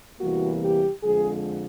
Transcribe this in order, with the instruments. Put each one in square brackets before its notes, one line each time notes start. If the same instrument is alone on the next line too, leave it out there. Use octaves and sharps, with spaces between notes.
[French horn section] E2 C3 E3 G3 A#3 F#4
G4
F2 D3 F3 G#3 G#4